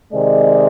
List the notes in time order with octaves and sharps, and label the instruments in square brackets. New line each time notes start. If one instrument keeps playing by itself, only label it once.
[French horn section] C3 D#3 G#3 D5